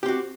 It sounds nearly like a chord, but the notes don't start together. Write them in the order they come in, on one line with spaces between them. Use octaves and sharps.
G4 C4 F#4